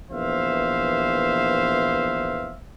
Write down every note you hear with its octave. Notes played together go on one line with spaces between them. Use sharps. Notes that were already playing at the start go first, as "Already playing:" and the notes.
A#1 E3 B3 C5 E5 F5